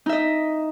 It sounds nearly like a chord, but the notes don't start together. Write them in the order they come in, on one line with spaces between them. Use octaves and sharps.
D#4 E5 D#5